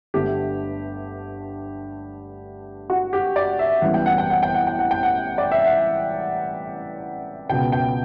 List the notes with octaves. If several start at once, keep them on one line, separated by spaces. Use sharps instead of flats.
G1 G2 D3 A3 G4
F#4
G4
D5
E5
A1 A2 G3 B3 F#5
G5
F#5
G5
F#5
G5
F#5
G5
F#5
G5
F#5
D5
E5
F#5
C#2 B2 F#3 B3 G5
G5